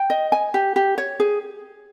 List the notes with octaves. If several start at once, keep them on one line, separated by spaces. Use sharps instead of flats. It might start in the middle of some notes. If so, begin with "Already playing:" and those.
Already playing: G5
D#5
G#5
G4
G4
C#5
G#4